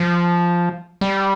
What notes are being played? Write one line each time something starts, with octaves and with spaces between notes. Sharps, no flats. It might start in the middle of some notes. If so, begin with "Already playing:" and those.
Already playing: F3
G3